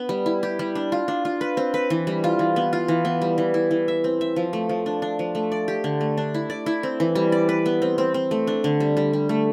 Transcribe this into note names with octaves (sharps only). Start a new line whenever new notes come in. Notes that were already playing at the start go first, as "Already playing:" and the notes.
Already playing: B3 D4
G3
E4
G4
G3
D4
F4
D4
F4
B4
C4
B4
E3
G3
F4
E3
B3
F4
E3
B3
G3
E3
E4
E3
E5
C4
E5
F3
A3
F3
D4
D4
F3
A3
D5
G4
D3
A3
D4
E4
D5
E4
C4
E3
G3
D5
B4
B3
C4
C4
C4
A3
D4
D3
G3
G3
G3
A3